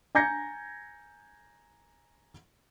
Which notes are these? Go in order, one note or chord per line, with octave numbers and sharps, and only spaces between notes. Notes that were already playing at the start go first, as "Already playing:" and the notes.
G#5 A#5 G6 G#6 A#6 C#7